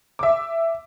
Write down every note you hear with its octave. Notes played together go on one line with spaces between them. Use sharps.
E5 D6